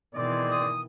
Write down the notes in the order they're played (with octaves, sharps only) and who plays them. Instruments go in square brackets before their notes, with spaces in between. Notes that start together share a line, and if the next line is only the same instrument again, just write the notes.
[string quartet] B2 D#3 E3 [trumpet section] G#3 C4 D5
[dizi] D#6